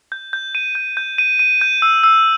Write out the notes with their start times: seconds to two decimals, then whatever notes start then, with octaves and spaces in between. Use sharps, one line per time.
0.12 G6
0.33 G6
0.55 D#7
0.75 G6
0.97 G6
1.18 D#7
1.39 D#7
1.61 G6
1.82 E6
2.04 E6